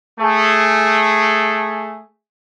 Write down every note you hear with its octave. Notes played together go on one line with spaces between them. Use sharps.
A3 G#4